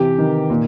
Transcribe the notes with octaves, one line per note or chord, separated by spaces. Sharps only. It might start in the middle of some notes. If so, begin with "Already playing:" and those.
Already playing: C3 E3 G4
D#3
A#2